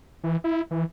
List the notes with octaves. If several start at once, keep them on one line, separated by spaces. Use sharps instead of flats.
E3
E4
E3